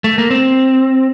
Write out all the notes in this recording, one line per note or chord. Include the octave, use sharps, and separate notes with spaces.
A3
A#3
C4